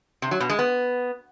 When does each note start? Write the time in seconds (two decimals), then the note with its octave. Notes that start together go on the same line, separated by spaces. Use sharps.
0.22 C3
0.31 F#3
0.40 B2
0.50 G#3
0.59 B3